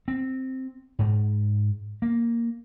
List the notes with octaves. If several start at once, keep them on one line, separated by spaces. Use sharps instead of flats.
C4
G#2
A#3